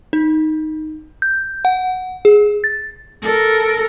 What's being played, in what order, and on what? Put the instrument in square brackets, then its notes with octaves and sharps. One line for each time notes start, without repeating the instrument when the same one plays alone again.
[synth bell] D#4
G6
F#5
G#4
A6
[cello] A4 A#4